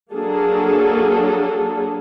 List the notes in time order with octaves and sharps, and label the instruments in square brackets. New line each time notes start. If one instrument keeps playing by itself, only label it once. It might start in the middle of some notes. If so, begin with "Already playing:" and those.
[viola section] F#3 A#3 D4 G#4 A4